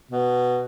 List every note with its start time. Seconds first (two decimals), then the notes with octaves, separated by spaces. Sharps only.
0.11 B2